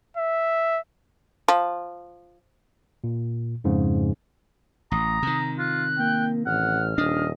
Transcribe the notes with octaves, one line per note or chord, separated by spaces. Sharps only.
E5
F3
A#2
F2 G#2 C#3
A1 A#5 D#6
C3 D#3
F4 F#6
A#3 G5
A1 F#5 F6
D#1 D4 D#5